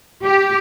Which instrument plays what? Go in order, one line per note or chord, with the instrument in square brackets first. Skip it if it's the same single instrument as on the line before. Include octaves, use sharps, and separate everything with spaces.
[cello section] G4